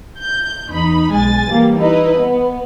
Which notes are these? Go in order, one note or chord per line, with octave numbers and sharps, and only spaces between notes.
G6
E2 D#4 B5
B1 G#3 G#5 A6
E3 G3 A#3
D#4 E4 B4 D#5
B3